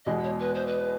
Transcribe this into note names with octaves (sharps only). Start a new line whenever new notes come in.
E2 B2 G#3 D#5
C#5
B4
C5
B4